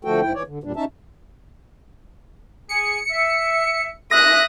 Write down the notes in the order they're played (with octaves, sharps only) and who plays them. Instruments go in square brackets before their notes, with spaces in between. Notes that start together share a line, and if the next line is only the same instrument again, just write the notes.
[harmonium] D3 F3 A3 F#4 A4 G5
G#2 E4 G5
E3 C#5 D5
D3
E2 A#2 G3 D4
C#4 D#4 E5 A5
[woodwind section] G#4 [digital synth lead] C#7
[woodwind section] E5
[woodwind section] E5 [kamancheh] D#6 F#6 [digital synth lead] A#6